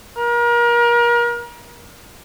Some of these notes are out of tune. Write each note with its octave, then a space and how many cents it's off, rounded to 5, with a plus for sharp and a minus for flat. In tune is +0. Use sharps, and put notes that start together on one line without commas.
A#4 +35